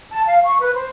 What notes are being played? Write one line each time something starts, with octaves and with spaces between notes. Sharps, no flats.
A5
F5
C#6
B4
C5